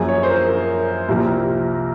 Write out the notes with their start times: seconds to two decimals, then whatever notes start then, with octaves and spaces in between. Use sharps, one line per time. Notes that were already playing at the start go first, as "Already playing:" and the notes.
Already playing: F#2 F3 A#3 G#4
0.08 C#5
0.23 C5
0.29 A#4
0.49 A#4
1.09 C2 C3 F3 A#3